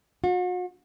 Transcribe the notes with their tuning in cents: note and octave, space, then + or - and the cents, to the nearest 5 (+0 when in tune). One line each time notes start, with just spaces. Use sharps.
F#4 -40